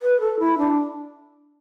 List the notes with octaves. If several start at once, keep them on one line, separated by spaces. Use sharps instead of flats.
B4
A4
E4
D4